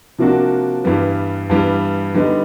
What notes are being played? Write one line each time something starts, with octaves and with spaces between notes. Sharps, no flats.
C3 F3 A#3 D4 F#4
G2 E3 G3 B3
G2 E3 G3 B3
D3 G3 B3 D#4